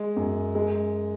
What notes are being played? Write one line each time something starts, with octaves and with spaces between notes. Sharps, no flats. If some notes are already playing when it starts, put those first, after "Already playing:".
Already playing: G#3
F#2
G#3